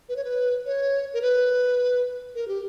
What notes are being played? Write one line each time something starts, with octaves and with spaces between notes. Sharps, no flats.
B4
C#5
B4
C#5
A#4
B4
A#4
G4